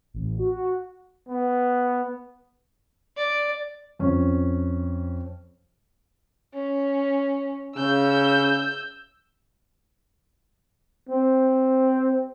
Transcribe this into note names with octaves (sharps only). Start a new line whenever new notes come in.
A1
F#4
B3
D5
F2 C#4
C#4
C#3 E6 G6
C4